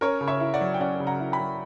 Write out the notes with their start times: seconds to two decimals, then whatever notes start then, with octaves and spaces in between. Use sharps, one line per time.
0.01 C#4 A#4 C#5
0.21 C#3
0.28 C#5 E5
0.40 E4
0.54 D5 F#5
0.61 F#3
0.74 G5
0.80 C#4 D5 F#5
1.00 C#3
1.07 F#5 A#5
1.20 E4
1.32 G5 B5
1.40 F#3